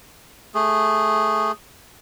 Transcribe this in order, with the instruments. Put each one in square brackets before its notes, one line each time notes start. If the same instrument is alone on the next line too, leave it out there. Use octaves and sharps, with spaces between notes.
[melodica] A3 G#4